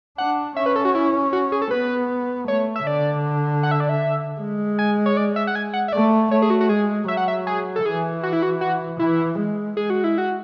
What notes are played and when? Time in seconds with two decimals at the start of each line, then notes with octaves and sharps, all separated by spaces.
0.18 D4 F#5
0.56 C#4 E5
0.66 B4
0.76 A4
0.85 F#4
0.95 E4
1.33 F#4
1.52 G#4
1.62 A4
1.71 B3 B4
2.48 A3 C#5
2.76 E5
2.86 D3 D5
3.63 F#5
3.71 E5
3.80 D5
3.89 E5
4.40 G#3
4.79 G#5
5.06 C#5
5.17 D5
5.36 E5
5.47 F#5
5.55 G#5
5.73 F#5
5.88 E5
5.93 A3 D5
6.31 A3 C#5
6.42 G#4
6.50 F#4
6.61 F#4
6.69 G#3 G#4
7.08 F#3 E5
7.17 F#5
7.28 E5
7.47 G#4
7.76 A4
7.85 E3 G#4
8.23 F#4
8.33 E4
8.42 F#4
8.61 F#4
8.99 E3 E4
9.38 G#3
9.77 G#3 G#4
9.90 F#4
10.04 E4
10.18 F#4